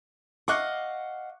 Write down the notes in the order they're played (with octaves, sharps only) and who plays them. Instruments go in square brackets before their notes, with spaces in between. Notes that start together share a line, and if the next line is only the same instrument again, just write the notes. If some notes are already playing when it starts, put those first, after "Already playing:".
[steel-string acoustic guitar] D#5 F5 F#5 [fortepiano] C#6 D6 F#6